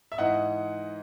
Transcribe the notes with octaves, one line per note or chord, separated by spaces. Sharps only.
E5
G#2 E3 D#5 F#5